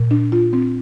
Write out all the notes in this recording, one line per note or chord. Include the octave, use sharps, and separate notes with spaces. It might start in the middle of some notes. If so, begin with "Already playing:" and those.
Already playing: A#2
D4
F4
C4